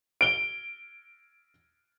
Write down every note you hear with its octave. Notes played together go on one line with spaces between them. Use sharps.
D7 G7